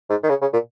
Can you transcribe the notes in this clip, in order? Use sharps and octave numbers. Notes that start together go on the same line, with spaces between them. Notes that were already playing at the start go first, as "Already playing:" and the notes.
G#2
D#3
C#3
C#3
A#2